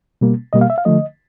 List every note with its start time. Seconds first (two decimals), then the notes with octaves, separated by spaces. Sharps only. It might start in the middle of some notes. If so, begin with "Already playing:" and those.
0.21 B2 G3 A#3
0.53 B2 G3 A#3 D#5
0.61 F5
0.70 E5
0.78 F5
0.85 D3 F3 A3 D#5